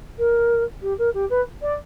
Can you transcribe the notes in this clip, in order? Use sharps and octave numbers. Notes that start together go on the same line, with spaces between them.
A#4
G4
A#4
G4
B4
D5